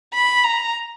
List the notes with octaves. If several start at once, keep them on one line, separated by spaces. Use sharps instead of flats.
B5
A#5